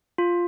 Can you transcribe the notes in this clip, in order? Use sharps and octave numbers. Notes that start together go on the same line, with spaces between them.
F4